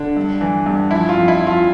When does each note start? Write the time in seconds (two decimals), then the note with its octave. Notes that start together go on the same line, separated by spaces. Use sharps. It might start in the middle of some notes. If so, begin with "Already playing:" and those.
Already playing: D3 D4
0.17 G2
0.41 E3
0.66 G2
0.90 F3 E4
1.09 F4
1.15 F2
1.28 E4
1.40 F3
1.47 F4